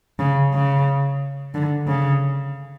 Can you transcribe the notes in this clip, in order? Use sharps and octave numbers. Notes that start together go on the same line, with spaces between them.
C#3
C#3
D3
C#3